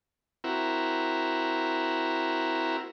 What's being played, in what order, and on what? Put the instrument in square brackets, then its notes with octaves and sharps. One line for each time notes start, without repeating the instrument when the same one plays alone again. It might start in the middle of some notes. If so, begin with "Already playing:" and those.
[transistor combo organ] C4 E4 F#4 A#4